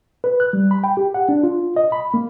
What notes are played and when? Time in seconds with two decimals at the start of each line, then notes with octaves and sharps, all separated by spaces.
0.24 B4
0.40 F#6
0.53 G3
0.71 B5
0.84 G5
0.97 G4
1.14 F#5
1.29 D4
1.43 F4
1.76 D#5
1.92 B5
2.14 A#3